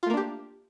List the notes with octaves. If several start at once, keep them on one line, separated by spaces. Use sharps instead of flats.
A3 A#3 D4 F4 G4